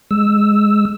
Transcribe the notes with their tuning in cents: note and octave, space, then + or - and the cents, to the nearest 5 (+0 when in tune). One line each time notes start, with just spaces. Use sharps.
G#3 +0 E6 +0